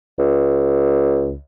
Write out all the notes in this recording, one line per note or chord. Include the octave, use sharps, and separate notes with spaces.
C#2